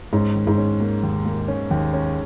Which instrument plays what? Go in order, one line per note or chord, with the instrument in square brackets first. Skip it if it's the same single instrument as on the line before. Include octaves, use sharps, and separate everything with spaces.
[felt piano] G#2 [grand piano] C#4
[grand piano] D#3
[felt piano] G#2
[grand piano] C#4
A#3
D#2
A#3
C#4
D#2
C#4